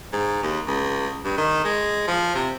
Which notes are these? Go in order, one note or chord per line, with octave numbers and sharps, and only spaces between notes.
G#2
D#2
C#2
G2
D#3
G#3
F3
C3